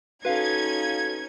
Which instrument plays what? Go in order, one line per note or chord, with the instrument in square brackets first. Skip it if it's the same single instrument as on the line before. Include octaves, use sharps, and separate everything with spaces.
[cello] C#4 D#4 [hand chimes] F#4 A4 [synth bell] B4 F5 [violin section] G#6